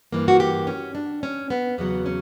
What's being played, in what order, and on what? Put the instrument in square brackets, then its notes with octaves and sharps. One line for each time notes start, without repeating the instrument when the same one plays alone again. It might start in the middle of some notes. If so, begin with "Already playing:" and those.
[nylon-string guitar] G2 E3 A#3
F#4
G4
C#4
D4
C#4
B3
E2 C#3 F#3 B3
C#4